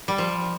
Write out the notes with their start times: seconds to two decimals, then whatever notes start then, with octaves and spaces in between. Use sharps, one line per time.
0.08 G3
0.18 F3